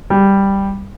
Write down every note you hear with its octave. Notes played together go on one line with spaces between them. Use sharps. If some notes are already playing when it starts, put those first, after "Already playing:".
G3